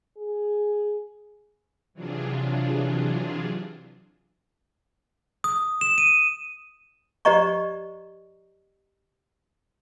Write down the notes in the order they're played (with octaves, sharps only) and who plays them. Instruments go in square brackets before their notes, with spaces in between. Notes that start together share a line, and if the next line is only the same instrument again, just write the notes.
[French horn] G#4
[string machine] C3 E3 F#3 D4 F4 G#4
[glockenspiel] D#6
E7
D#7
[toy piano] G4 C5 D5 D#5 A#5 C#6